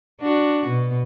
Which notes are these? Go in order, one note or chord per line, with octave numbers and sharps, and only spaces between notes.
D4 F#4
B2